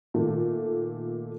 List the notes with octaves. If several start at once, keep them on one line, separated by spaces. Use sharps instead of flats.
A#2 D#3 A3 F#4 A4